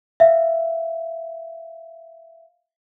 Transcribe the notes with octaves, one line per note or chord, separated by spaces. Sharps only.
E5 F5